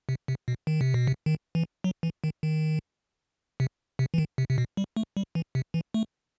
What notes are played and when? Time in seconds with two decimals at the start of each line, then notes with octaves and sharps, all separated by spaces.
0.09 C3
0.28 C3
0.48 B2
0.67 D#3
0.81 C3
0.94 B2
1.07 C3
1.26 D#3
1.55 E3
1.84 F#3
2.03 E3
2.24 D#3
2.43 D#3
3.60 C3
3.99 C3
4.14 E3
4.18 D#3
4.38 C3
4.50 C3
4.58 B2
4.77 G3
4.97 A3
5.17 G3
5.35 E3
5.55 C3
5.74 E3
5.94 A3